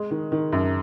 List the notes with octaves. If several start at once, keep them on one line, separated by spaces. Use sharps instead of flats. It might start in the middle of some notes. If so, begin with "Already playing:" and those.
Already playing: G#3
D#3
D#3
F#2